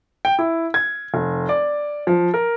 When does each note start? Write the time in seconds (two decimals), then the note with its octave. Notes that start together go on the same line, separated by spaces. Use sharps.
0.25 G5
0.39 E4
0.74 G#6
1.14 F1
1.49 D5
2.07 F3
2.34 A#4